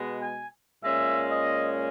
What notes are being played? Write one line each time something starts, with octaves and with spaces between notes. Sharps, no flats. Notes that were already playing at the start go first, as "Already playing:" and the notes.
Already playing: B2 G#3 B3
G#5
A#2 G#3 C#4 E5
D#5